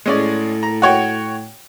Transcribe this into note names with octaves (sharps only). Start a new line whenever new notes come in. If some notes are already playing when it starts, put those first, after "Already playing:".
A2 G#3 C#4 D5
A#5
F#4 C#5 G5